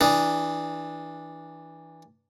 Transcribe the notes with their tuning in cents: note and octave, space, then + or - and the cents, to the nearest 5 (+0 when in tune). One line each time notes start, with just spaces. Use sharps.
E3 -15 D4 +0 G#4 +0